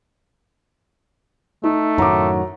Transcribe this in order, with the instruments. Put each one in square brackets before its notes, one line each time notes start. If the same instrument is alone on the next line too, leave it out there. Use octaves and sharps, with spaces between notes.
[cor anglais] A3 [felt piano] D#4
[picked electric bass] F#2 A2 D#3 [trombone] F#3 [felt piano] A#5 D6